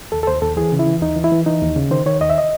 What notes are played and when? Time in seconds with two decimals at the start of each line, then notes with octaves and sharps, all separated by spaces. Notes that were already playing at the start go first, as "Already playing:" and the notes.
0.12 D#2 A4
0.23 A4
0.27 D#2 C5
0.42 D#2 A4
0.57 E3 G#4
0.72 C#3
0.79 E4
0.87 E3
1.02 D#2 D#4
1.16 E3
1.24 E4
1.32 E3
1.46 E3 D#4
1.61 D#2
1.76 C#3
1.91 D#3 C5
2.06 D#3 C#5
2.20 D#2 D#5
2.30 E5
2.38 D#5